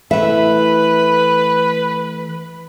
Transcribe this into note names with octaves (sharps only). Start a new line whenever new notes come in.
E3 A3 B4 E5